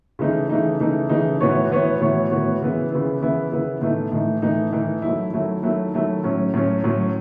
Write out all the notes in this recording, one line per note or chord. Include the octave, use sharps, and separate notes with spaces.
C#3 E3 A3 D#4
C#3 E3 A3 D#4
C#3 E3 A3 D#4
C#3 E3 A3 D#4
A2 E3 B3 F#4 C#5
A2 E3 B3 F#4 C#5
A2 E3 B3 F#4 C#5
A2 E3 B3 F#4 C#5
C#3 E3 B3 E4
C#3 E3 B3 E4
C#3 E3 B3 E4
C#3 E3 B3 E4
A2 E3 A3 D#4
A2 E3 A3 D#4
A2 E3 A3 D#4
A2 E3 A3 D#4
D#3 F#3 A3 E4
D#3 F#3 A3 E4
D#3 F#3 A3 E4
D#3 F#3 A3 E4
A2 F#3 C#4
A2 F#3 C#4
A2 F#3 C#4